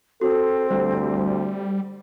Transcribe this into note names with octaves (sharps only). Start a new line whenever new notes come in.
C4 F#4 A4
D2 G3 C5